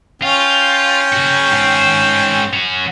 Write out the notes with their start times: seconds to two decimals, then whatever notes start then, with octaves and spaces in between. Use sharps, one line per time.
0.22 C#4 F4 G5
1.13 C#3 F#4
1.53 G#2 C4
2.54 C#4 F#4